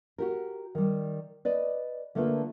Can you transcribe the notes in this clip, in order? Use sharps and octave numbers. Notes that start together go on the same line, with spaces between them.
F#4 G4 A#4
D#3 G3
B4 D5 D#5
D3 A3 A#3 F4 B4